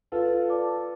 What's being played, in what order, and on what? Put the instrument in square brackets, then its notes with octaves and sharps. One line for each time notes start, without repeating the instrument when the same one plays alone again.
[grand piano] F4 A4 [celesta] B4
[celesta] D5 A5 D6